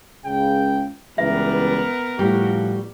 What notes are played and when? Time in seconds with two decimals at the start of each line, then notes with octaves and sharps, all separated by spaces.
0.26 C#2 C#3 G5
1.18 C#2 E3 G3 B3 A#4 E5
2.19 A2 F3 G3 F#4